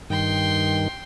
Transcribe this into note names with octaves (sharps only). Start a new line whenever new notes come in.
G2 D#3 G5 C6